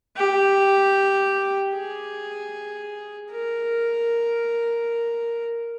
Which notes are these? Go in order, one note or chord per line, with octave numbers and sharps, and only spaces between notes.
G4
G#4
A#4